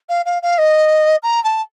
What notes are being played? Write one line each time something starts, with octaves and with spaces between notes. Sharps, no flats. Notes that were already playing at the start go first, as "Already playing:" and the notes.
F5
F5
F5
D#5
A#5
A5